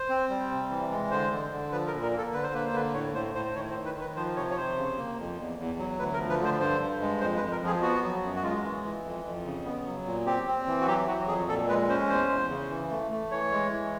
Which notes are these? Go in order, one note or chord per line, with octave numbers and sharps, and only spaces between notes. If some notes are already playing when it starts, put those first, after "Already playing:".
Already playing: C5
C4
G3
C3
E3
G#3
D3 C5
D3
D3
F3 B4
A#4
A#2
A#4
A#3 A4
D3 B4
C5
A#3 B4
C5
D3 B4
A2 C#5
A2 C5
A2 C5
C5
D#3 C#5
C5
D#3
B4
D#3
B4
F3 C5
C3 C#5
C#5
C3 C5
C#3
A#3
F2
E2
E2
F#3
D2 B4
A#4
F3
B4
D3 C5
G2 C5
G2
G#3
F2 C5
B4
F2
A#4
F3 G#4
B3 F#4
F#3
F#2
F#4
G#3 F4
E3
E3
F2
F2
C#3
B3
F#3
A#2
C4 G4
C4
E3
F#4
F#3 G4
F#3 F#4
F2 G#4
A#2 A4
G#3 B4
C#4 C5
E2 C5
E2
C#3
E3
A3
A3
E3 C#5
G#3
E3